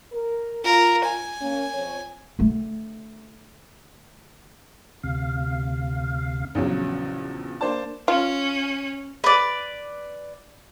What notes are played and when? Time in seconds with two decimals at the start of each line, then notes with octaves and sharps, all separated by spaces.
0.12 A#4
0.65 F4 A#4
1.05 G#5
1.40 A#3 C#4
1.73 F2 C#5
2.39 D3 A3
5.03 D2 C3 F5
6.55 A#1 E2 C#3 F#3
7.61 A#3 D4 C5 D5 A5
8.08 C#4 F4
9.24 B4 D5